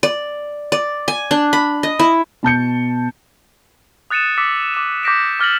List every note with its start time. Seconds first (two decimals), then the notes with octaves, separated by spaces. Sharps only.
0.03 D5
0.72 D5
1.08 G#5
1.31 D4
1.53 B5
1.83 D#5
1.99 E4
2.43 B2 A5 G6 C#7
4.10 D#6 F#6 A6 C#7 D#7 E7
4.38 D6 E6 B6 C#7
4.74 D6 E7
5.03 D6 G6 A#6 B6 D7 E7
5.40 D6 F6 A6 A#6 F#7